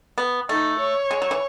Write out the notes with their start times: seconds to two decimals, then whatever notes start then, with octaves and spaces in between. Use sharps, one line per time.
0.18 B3
0.49 A3 D#4
0.80 C#5
1.11 G#3
1.22 F#3
1.31 E3